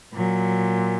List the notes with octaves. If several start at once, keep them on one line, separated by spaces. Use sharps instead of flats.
A#2 F#3